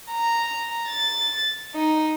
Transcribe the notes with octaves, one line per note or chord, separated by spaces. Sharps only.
A#5
A6
D#4